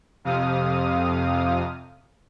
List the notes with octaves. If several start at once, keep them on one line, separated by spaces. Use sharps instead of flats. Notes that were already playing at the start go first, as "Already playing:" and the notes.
F2 C3 F5 D#6